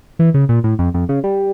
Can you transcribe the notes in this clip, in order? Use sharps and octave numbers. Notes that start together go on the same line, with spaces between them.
E3
C#3
A#2
A2
F2
F2
C#3
G3